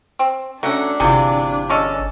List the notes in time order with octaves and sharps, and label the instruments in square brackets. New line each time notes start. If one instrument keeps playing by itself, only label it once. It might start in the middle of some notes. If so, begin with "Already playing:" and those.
[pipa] C4
[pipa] F#3 F#5 A#5 [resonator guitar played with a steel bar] A3 C#4 [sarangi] D4
[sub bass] G1 [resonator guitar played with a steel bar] C3 E3 F4 [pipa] G#4
[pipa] G#3 C#4 A4